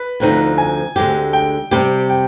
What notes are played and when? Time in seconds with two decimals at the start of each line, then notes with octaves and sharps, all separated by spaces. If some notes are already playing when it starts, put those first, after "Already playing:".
Already playing: B4
0.20 D2 D3 F3 C4 D#4
0.58 G#5
0.96 D2 D3 G#3 C4 G4
1.33 G5
1.71 C3 G3 C4 G4
2.10 G5